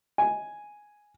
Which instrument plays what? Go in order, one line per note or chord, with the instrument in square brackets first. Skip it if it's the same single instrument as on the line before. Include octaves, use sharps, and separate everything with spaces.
[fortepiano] G#5